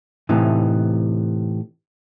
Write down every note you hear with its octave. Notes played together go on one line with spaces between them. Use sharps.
A2 C3 E3 D#4